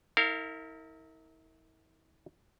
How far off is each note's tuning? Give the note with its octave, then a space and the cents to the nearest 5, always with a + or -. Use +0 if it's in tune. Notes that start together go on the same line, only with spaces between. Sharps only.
E4 -40 A#4 -25 F5 +0